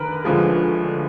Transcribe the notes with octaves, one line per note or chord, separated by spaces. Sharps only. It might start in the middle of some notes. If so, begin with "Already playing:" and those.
Already playing: F1 D#2 D3 A#4 B4
D2 D3 F3 G#3